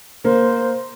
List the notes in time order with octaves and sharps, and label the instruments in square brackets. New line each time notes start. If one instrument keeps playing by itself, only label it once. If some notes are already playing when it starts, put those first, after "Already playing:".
[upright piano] A#3 [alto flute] C5